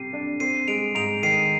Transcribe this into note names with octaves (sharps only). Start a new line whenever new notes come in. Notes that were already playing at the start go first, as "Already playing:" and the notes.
Already playing: C3 G3 G4 C7 D#7
D4
C4 C7 D#7
G#3 D7 F7
G#2 D7 F7
D#3 C7 D#7